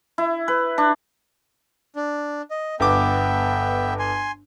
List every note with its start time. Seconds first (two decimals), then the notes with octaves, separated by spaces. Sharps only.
0.18 E4
0.48 B4
0.78 D4
1.96 D4
2.51 D#5
2.80 G1 B3 E5 G5 D6
3.99 G#5 C6